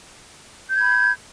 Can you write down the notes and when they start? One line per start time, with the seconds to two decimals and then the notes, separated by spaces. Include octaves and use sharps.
0.70 G6
0.75 G#6
0.79 B5